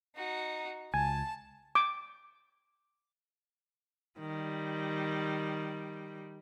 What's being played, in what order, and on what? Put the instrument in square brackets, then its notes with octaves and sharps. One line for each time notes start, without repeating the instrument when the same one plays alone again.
[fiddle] D#4 F#4
[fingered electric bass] C#2 [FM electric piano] G#5 [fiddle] A5
[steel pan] D6
[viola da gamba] D#3 G3